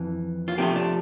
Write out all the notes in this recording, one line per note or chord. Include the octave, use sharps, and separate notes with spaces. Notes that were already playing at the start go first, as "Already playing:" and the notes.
Already playing: F2 E3
F4
C3 F3 A3 G4
D4